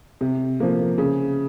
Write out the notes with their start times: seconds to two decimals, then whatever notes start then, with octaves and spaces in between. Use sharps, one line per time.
0.21 C3
0.60 F3 A#3
0.98 C#3